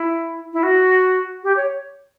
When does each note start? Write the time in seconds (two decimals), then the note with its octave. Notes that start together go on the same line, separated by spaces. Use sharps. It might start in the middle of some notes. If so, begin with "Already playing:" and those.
Already playing: E4
0.53 E4
0.63 F#4
1.43 G4
1.56 C#5